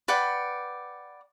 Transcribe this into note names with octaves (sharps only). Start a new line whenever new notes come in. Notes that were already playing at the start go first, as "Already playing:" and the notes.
B4 D5 F#5 G5